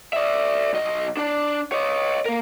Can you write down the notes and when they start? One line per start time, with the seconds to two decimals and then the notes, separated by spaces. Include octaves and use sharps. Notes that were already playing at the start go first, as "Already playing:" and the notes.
0.13 D5 E5
0.73 B1 D#5
1.17 D4 D5
1.72 C#5 D#5
2.26 A#3 A#4